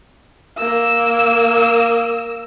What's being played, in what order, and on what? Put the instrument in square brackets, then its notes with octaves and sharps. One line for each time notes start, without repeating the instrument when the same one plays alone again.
[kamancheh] A#3 E6